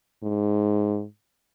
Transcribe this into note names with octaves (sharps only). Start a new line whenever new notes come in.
G#2